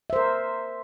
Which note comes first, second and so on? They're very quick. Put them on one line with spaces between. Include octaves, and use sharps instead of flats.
E5 C5 A#4